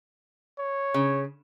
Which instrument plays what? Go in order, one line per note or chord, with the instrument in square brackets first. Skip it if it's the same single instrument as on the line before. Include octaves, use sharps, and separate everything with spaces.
[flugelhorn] C#5
[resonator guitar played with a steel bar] C#3